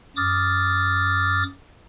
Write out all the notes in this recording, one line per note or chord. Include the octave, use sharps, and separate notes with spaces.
F#2 D6 D#6 F6 A6